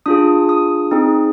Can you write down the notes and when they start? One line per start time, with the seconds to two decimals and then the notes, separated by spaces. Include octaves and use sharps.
0.06 D4 F4 G#4 D#6
0.49 D#6
0.91 C4 D#4 G#4